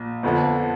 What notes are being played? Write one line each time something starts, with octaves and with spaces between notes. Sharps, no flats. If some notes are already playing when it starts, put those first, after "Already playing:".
Already playing: A#1
G1 F2 D3